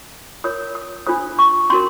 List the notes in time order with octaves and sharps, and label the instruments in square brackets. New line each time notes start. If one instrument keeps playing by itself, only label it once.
[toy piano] F4 A#4 C#5 D#6
D#6
D4 F4 A4 C5 D#6
C#6
C#4 F#4 A#4 C6